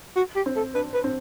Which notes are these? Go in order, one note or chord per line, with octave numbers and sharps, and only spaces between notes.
F#4
G4
C4
A4
D4 B4
B4
C4